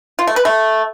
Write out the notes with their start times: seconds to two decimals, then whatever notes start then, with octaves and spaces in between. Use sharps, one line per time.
0.19 F4
0.27 A3
0.36 B4
0.45 A3